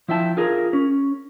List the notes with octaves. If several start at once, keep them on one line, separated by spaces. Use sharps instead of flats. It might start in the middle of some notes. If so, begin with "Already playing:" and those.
F3 E4 E5 G5 A5
F4 G#4 A#4
C#4